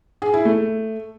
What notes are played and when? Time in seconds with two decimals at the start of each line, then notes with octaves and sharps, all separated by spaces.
0.22 G#4
0.34 E4
0.45 A3